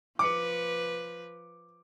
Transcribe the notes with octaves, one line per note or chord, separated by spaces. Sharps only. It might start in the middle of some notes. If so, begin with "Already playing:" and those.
F3 B4 D6 C#7